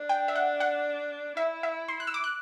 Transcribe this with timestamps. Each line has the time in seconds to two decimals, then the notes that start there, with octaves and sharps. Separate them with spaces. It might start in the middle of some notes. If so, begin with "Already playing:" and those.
Already playing: D4
0.09 G5
0.28 E5
0.36 F#5
0.60 F#5
1.37 E4 E5
1.63 E5
1.88 C6
2.00 F#6
2.07 E6
2.14 D6
2.24 F#6